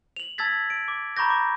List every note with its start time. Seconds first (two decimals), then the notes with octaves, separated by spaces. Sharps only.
0.16 F7 F#7
0.38 A5 E6 G#6 A6 B6
0.70 D7
0.88 D6
1.17 A#5 B5 C#6 D6 G6 A#6
1.30 D6